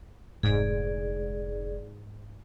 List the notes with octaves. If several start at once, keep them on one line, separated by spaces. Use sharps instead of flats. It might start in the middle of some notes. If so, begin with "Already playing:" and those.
F1 G#2 D3 G#4 D5